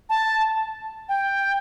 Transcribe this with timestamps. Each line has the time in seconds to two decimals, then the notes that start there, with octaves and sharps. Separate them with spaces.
0.10 A5
1.09 G5